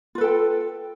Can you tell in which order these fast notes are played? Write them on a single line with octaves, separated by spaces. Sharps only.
F4 B4 A4 G5